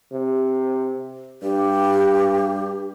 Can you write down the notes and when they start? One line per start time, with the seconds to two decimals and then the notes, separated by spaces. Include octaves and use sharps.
0.12 C3
1.43 G2 G4